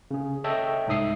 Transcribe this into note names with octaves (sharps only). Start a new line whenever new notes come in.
C#3 G#4
A4 C#5 D#5 E5 G5 A5
C2 G#2 D#4 E5 D#6 C7